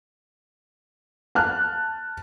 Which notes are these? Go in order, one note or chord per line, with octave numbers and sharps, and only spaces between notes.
A5 F6 F#6